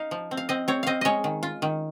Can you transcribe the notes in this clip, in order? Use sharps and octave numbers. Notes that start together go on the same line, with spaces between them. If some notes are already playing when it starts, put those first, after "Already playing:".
Already playing: D#4 D#5 F5
F3
C4
F5
C4 D#5
C4 C#5
C4 D#5 F5
G#3 C#5 D#5
D#3
F4
D#3